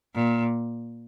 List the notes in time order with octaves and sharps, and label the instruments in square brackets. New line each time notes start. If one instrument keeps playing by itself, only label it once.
[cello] A#2